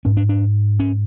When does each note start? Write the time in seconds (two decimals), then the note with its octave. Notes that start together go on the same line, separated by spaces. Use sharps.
0.05 G#2 C#4
0.17 D4
0.29 D4
0.80 C#4